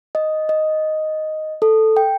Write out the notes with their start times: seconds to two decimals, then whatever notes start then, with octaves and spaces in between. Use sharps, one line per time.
0.15 D#5
0.49 D#5
1.62 A4
1.97 G5